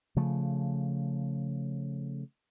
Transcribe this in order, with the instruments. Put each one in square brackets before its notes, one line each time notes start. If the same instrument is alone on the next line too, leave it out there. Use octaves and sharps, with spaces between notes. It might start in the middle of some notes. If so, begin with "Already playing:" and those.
[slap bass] C#3 F3 A3